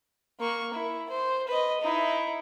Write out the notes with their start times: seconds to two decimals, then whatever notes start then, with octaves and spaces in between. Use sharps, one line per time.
0.40 A#3 C#6
0.74 E4
1.10 C5
1.48 B4 D#5
1.81 D#4 E4